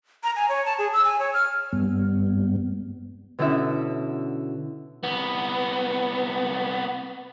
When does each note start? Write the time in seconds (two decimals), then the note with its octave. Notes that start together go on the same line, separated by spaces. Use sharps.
0.24 A#5
0.36 G#5
0.49 C#5
0.66 A5
0.78 G#4
0.93 E6
1.05 G#5
1.19 C#5
1.34 F6
1.73 G2 G3 B3
3.39 B2 D3 C#4 E4 E5
5.03 C2 B3